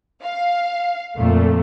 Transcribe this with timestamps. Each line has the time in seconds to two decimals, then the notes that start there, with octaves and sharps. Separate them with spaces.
0.23 F5
1.16 F2 A#2 A3